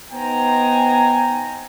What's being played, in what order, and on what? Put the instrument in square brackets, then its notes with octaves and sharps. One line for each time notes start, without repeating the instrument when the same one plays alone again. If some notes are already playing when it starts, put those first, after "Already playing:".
[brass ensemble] B3 D#4 C5 G5 G#5 A#5